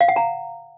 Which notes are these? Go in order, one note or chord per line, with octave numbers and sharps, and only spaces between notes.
F5
F#5
A#5